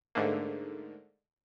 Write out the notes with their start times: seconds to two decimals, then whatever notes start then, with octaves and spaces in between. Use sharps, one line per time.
0.15 G#2 D3 A3 A#3